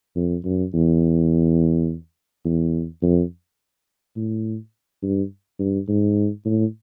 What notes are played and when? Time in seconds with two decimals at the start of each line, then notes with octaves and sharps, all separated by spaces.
0.16 F2
0.44 F#2
0.74 E2
2.45 E2
3.02 F2
4.16 A2
5.03 G2
5.59 G2
5.88 G#2
6.45 A2